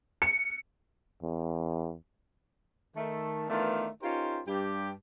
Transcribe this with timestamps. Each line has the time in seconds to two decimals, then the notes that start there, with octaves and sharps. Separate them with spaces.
0.22 C#7
1.23 E2
2.95 D#3 A3
3.48 D#3 E3 A3 B3 D4 F4
4.02 C#4 D#4 F4 G4 A#4 C5
4.47 G2 G4